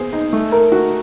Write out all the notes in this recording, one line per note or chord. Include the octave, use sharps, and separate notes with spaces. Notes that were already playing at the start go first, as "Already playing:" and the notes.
Already playing: B3 G#4 C5
D#4
A3
A#4
F#4